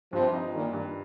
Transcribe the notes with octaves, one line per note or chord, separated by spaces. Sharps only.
G2 C3 F3
D#4
A#2 D#3 G3
G2